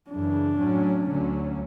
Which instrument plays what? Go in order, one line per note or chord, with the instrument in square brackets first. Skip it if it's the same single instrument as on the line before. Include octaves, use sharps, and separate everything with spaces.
[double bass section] F#2 C#3 E3 [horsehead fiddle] D4
[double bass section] A2 F#3 C#4
D2 D3 F#3 C#4